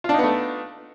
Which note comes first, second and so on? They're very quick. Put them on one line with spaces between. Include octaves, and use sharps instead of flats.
F4 D4 D#4 B3 A3